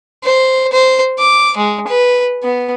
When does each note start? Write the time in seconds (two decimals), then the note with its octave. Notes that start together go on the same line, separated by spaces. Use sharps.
0.24 C5
0.73 C5
1.19 D6
1.57 G#3
1.88 B4
2.43 B3